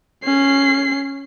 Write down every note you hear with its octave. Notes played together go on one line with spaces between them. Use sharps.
C#4 C7